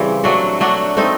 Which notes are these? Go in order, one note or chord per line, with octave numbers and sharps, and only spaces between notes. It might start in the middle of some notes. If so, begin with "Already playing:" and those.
Already playing: C#3 E3 G3 C4
F#3 A3 D4 F#4
F#3 A3 D4 F#4
A3 C4 D#4